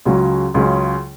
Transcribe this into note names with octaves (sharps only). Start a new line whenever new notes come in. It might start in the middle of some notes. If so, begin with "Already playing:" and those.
C#2 C#3 F#3 C#4
C#2 C#3 F#3 C#4